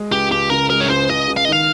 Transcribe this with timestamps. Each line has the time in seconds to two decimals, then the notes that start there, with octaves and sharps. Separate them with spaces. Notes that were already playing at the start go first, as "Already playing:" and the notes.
Already playing: G#3
0.11 C#2 G4
0.30 C#2 G4
0.50 C#3 A#4
0.70 G#3 A#4
0.80 C#5
0.90 C#2 C5
1.09 C#2 D#5
1.28 C#3
1.37 F5
1.45 D#5
1.48 D#3 F5